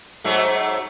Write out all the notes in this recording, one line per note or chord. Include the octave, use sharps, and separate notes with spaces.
G#2 F#3 A3